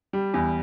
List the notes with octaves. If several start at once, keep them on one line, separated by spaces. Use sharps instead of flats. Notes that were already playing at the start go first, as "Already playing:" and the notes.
G3
E2